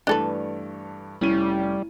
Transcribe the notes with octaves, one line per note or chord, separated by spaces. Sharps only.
G2 E3 A3 D4 A4 B4
F1 G3 C#4 E4 D#7